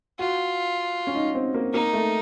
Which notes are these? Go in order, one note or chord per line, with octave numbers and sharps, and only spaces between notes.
F4 F#4
C#4
D#4
C4
A#3
A#3 D#4
A3